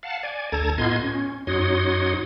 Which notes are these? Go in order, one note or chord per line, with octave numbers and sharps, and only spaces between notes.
F5 F#5 A5
D5 G#5
D2 A4 A5 A#5 G#6
A2 B3 F4 D#5 C6 G#6
C#4
F#2 D#4 F#4 C#5 C6 D#6